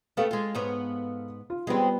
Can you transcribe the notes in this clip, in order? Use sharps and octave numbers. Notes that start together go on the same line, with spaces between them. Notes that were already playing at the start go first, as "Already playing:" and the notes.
A3 B3 A4 F5
G#3 F4
G#2 B3 C#5
F4
G3 G#3 B3 C4 F4